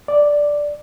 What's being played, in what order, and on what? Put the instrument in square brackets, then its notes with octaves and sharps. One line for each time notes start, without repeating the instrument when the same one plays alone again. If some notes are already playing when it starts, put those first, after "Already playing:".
[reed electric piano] D5